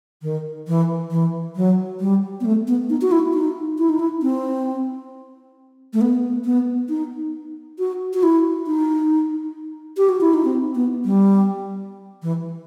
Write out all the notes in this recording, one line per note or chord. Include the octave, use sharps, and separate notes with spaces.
D#3
E3
E3
F#3
G3
B3
A3
B3
D#4
F#4
E4
D#4
E4
D#4
E4
C4
A3
B3
B3
D#4
F#4
F#4
E4
D#4
G4
F#4
E4
D#4
C4
B3
G3
E3